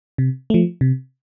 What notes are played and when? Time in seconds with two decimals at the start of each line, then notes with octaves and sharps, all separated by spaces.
0.18 C3
0.50 F3 A3
0.81 C3